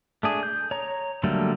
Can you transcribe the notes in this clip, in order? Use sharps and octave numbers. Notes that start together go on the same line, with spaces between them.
A3 D4 G#4
G6
C#5 A#5
D3 F#3 G3 A3 A#3